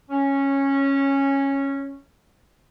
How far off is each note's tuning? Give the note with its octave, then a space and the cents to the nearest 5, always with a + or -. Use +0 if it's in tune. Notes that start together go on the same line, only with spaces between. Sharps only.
C#4 -10 C#5 +0